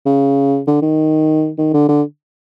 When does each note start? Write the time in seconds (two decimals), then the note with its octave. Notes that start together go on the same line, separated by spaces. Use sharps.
0.05 C#3
0.67 D3
0.82 D#3
1.58 D#3
1.73 D3
1.89 D3